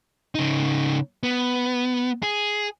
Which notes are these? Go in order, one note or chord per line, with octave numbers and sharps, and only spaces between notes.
C#3 D#4
B3
G#4